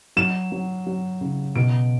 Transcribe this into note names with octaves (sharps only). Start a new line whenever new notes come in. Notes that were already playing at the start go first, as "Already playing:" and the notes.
F#3 E7
F#3
F#3
C#3
B2 D7